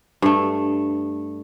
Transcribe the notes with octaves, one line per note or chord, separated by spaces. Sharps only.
G2 A3